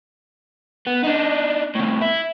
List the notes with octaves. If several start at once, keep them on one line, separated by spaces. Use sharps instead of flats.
B3
D4 D#4
A2 C3
E4